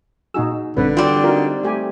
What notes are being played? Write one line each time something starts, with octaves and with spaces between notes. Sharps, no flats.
A#2 D#4 F#4 G#4 E6
A#1 G2 D3 C4 B4 D5
G3 C4 F4 F#4
D#4 F4 F#4 A#4
A3 G4 G#5